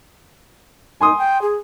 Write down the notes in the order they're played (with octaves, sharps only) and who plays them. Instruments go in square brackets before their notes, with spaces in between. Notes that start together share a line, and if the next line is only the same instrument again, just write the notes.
[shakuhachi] D#4 [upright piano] G#5 C6 D#6
[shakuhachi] G5
G#4